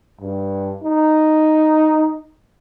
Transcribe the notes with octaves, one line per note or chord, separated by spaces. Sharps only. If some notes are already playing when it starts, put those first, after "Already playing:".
G2
D#4